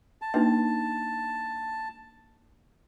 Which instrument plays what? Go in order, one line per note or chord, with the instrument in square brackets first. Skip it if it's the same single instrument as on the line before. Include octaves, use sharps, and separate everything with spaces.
[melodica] A5
[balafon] A#3 D4 G5 [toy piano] D#4 B4 E5